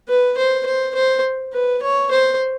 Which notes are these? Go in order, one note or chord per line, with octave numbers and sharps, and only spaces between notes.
B4
C5
C5
C5
B4
C#5
C5